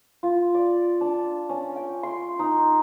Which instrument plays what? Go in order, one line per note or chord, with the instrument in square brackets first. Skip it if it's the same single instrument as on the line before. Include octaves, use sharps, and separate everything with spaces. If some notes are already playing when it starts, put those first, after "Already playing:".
[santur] F4
D5
D4
C#4
G5
C6
D#4